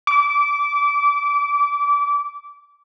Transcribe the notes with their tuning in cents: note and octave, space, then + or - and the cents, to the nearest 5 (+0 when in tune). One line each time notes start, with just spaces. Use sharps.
D6 -25